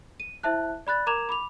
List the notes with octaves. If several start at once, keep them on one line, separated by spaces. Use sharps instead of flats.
D#7
E4 C5 E5 A5 F#6
D5 B5 F#6 A6
A#4 A#5 D6 G#6 E7 F7
B5 D6 F7